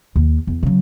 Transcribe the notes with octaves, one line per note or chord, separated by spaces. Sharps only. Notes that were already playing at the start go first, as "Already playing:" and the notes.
D#2
E2
C#3 F#3